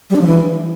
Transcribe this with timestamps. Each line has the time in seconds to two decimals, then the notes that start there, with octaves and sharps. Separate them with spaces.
0.10 G3
0.16 D4
0.21 F3
0.27 E3